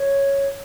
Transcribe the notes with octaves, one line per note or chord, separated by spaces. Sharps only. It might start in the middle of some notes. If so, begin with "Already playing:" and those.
Already playing: C#5